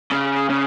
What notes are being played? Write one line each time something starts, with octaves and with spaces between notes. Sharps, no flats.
C#3
C#3